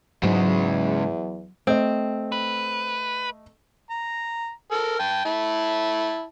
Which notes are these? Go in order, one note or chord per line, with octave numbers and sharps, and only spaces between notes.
E2 G#2 C#3 F#3 G#3
A3 C4 D#5
B4
A#5
A4 A#4
G5 A5
E4 A5